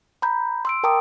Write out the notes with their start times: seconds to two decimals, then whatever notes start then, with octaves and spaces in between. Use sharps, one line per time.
0.22 A#5 B5 G6
0.65 C6 E6 D7
0.83 A#4 G5 A5 A#5 D6 D#6